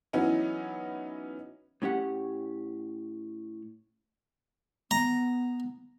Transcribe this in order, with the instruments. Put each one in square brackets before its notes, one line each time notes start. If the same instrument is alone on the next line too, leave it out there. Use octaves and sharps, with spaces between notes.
[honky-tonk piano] E3 F#3 B3 C#4 D#4 E4
[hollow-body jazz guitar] A2 C#4 G4 F#5
[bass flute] B3 [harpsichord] A#5